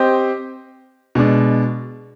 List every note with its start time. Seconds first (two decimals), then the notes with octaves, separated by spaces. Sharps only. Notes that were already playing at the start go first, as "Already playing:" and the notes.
Already playing: C4 G4 C5 D#5
1.15 B2 G#3 D4